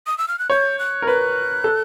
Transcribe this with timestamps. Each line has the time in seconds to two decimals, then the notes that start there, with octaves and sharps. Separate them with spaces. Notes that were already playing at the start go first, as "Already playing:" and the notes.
0.07 D#6
0.18 E6
0.28 F6
0.39 F#6
0.50 C#5 G6
0.79 F#6
1.02 A#4
1.07 B4 F#6
1.64 A4